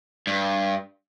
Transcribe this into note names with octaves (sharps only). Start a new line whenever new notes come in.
G2